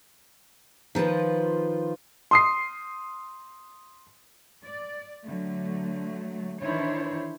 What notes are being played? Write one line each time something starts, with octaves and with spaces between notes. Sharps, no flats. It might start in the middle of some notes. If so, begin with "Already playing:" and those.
D#3 F3 F4 B4
C6 D#6 C7
D5
D3 F#3 A3
D#3 E3 D4 E4 C5 C#5